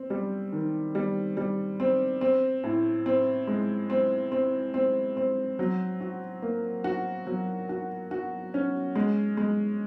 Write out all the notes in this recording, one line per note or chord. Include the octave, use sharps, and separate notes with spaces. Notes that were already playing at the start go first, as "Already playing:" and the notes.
Already playing: C4
G3
D#3
G3
G3
C4
C4
A2
C4
G#3
C4
C4
C4
C4
F#3
F#4
A#3
F#4
F#3
F#4
F#4
C#4
G#3
G#3